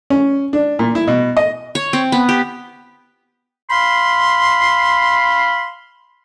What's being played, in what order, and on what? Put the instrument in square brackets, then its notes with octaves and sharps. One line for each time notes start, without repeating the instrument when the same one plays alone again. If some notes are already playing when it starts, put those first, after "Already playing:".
[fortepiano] C#4
D4
A#2
E4
B2
D#5
[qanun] C#5
C4
B3
G4
[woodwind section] F5 B5 C6